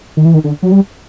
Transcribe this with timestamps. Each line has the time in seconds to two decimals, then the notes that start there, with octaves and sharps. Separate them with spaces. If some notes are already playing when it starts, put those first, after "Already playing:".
0.17 D#3
0.25 E3
0.34 D#3
0.44 D3
0.62 F#3
0.72 G3